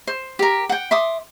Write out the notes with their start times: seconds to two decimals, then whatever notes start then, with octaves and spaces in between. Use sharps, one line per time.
0.07 C5
0.39 G4 A#4
0.69 F#5 G5
0.91 E5 C6 D6 D#6